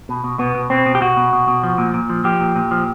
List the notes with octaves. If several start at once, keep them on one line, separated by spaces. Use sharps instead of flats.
B2
B2
B2 B3
B2
B2 C4
B2
G4
B2 F#4
B2
B2
B2
F3
A#2
A#2
F3
F3 G4
A#2
A#2
F3